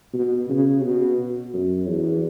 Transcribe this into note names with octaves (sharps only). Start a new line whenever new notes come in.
B2
C#3
B2
F#2
E2